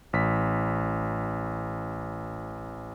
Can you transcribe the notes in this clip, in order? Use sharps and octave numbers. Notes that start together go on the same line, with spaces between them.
A1 B6